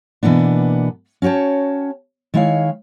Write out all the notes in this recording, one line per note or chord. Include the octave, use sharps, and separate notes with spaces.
B2 E3 A#3 B3 D4
C#4 F#4 C#5 G5 A5
D#3 G#3 E4 C#5 F5